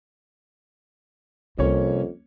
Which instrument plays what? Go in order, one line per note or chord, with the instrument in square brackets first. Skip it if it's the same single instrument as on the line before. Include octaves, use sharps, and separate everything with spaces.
[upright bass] C2 [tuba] F2 [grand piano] A#3 C#4 C#5